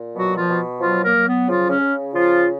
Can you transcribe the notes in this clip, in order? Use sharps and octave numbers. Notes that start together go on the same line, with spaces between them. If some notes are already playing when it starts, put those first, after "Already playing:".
Already playing: A#2
B2 F#3 F#4
F3 F4
B2
F3 F#3 F4
A#3 A#4
F#3
B3
C#3 F3 F4
C#3 C#4
C#3
C#3 F3 F4